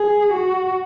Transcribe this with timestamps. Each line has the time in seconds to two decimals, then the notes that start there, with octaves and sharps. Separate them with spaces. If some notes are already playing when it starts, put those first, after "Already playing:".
Already playing: G#4
0.34 F#4